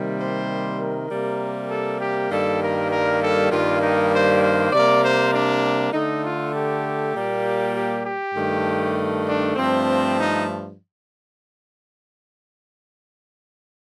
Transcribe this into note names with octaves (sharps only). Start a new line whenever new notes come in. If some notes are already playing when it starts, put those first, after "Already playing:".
Already playing: C3 D#3 G3 A#3
C5
A#4
C3 G3 A#3
A4
G4
G2 D#3 G3 A#3 A4
A#4
A#4
A4
G2 D#3 G3 A#3 F4
D#4
C5
C5
C3 G3 A#3 D5
C5
D4
D3 A3 D#4
F4
G4
A#2 G3 A#3
G4
G4
G2 D#3 A3
D4
G2 F3 A3 C4
D#4